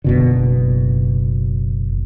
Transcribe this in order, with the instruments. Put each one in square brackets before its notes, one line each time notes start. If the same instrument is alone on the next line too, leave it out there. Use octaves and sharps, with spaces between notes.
[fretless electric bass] F#1 B2 D3